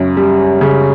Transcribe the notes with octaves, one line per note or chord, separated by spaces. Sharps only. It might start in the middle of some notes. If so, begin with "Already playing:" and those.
Already playing: F#2 C#3 C#4
G3
C#3